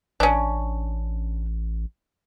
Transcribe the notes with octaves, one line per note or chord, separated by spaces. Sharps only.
A1 C#4 D4